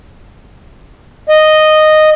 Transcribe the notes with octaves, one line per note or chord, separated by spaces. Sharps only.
D#5